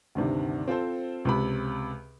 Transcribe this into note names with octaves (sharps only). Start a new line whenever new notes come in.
D2 G2 C3 D#3
C4 F4 A4 C5
C#2 C3 B5